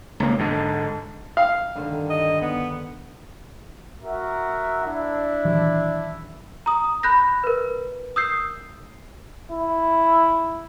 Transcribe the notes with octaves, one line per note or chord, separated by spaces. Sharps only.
C#2 A#3
G#2 D3
F5
G2 D3 D#3
D#5
B3
F#4 A#4 E5
D4 E4
D#1 E3 F#3
A#5 D#6
B5 F#6 G6 A#6
A#4 B4
D#6 E6 G6 C7
E4